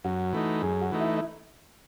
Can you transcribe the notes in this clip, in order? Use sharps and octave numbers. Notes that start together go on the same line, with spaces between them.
F#2 F#4
E3 A3 D#4
F#2 G#4
F#4
E3 A3 D#4
E4
E4